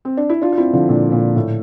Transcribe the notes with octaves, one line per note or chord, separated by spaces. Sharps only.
C4
D4
E4
D4 F4
F4
C4 E4
D3 F3
A#2 D3
A#2
A2